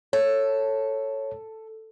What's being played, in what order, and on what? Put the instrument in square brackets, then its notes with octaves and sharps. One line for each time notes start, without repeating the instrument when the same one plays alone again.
[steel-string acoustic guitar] A4 [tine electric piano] C#5